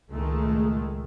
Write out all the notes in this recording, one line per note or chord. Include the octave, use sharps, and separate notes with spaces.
C#2 A#2 D#3 G#3 A3